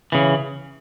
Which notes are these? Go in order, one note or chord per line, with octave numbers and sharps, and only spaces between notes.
C#3 E3